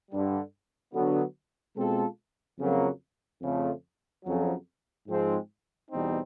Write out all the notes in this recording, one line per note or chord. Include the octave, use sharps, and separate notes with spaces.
G2 D3 G3
D3 F#3 B3
B2 G#3 C4 F4 A4
F2 C#3 F#3 A#3
F2 C#3 F3 A3
F2 C#3 F#3
G#2 F3 G#3 C4
E2 B2 G3 C4 D#4